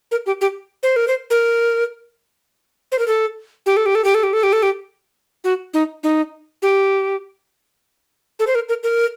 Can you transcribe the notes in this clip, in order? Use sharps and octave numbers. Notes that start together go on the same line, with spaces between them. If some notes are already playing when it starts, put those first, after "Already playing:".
A#4
G4
G4
C5
A#4
C5
A#4
C5
A#4
A4
G4
A4
G4
A4
G4
A4
G4
A4
G4
A4
G4
F#4
D#4
D#4
G4
A4
C5
A#4
A#4
A#4